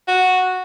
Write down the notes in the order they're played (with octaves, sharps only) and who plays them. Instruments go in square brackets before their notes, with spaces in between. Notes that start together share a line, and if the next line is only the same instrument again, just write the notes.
[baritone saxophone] F#4